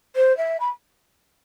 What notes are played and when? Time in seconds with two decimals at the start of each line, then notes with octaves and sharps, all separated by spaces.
0.15 C5
0.37 E5
0.60 B5